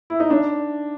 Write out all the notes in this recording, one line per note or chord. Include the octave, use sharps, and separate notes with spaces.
E4
D#4
D4